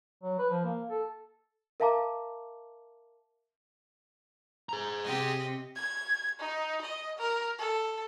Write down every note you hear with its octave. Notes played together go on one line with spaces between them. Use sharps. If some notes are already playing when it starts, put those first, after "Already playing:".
F#3
B4
F3
A#3
A4
A#4 E5 F5 A5 A#5 D6
G#4 A#5
C3 C4 G4 D#5
G#6
D#4
D#5
A#4
A4